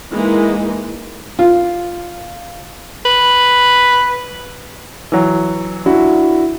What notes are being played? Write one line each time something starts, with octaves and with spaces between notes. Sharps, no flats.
E3 G#3 A#3 D#4
F4
B4
E3 F#3
D4 E4 F#4